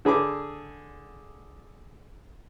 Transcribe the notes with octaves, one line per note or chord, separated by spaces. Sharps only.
D3 G#4 B5 D6